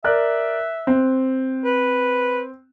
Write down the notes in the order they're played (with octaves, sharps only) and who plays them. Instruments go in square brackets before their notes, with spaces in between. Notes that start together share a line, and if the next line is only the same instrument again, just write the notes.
[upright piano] A#4 D5 F#6 [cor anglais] E5
[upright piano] C4
[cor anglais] B4